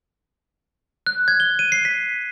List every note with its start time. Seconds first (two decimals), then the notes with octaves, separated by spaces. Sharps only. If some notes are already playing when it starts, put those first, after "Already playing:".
1.07 F#6
1.28 G#6
1.40 G7
1.59 D#7
1.72 C7
1.85 B6